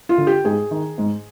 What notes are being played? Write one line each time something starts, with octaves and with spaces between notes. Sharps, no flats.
F4
D3
G4
G#2 G#4
D#3
G#2